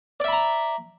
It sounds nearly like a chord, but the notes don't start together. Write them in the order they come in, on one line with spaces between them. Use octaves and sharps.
D5 E5 B5 A#5